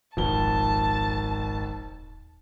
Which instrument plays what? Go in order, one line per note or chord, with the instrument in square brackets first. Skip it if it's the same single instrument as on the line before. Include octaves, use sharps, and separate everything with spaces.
[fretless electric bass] D#1 [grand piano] G#1 F2 G7 [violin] A5